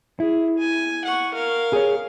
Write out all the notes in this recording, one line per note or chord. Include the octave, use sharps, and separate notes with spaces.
E4 G#4
G#5
F#5 C#6
A#4 F5
G#4 C#5